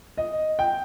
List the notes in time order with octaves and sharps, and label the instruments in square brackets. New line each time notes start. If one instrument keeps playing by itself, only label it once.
[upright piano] D#5
G5